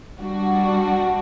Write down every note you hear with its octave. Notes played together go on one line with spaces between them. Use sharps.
G3 D4 F#4